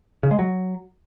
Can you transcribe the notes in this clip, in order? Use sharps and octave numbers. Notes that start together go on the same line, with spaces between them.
C#3
G#3
F#3